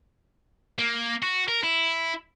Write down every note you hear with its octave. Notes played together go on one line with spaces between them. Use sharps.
A#3
F#4
A#4
E4